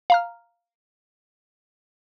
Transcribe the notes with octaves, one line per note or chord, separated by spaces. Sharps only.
F5 A#5 F6